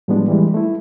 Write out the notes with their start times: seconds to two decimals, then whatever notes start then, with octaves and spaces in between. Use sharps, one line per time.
0.08 A2 F3 G3 G#3 B3 D4
0.28 E3 G3 G#3
0.54 A3 E4